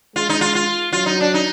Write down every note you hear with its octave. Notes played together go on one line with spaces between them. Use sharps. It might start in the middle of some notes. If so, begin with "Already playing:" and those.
G#3 F4
D#4
F4
F4
F#3 F4
D#4
D4
D#4